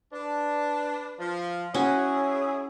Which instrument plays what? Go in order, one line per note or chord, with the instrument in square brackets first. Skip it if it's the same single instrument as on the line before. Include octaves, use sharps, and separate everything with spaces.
[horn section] D4 [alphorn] B4
[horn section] F3
[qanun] C#4 F#4 [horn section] E4 G#4 [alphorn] C#5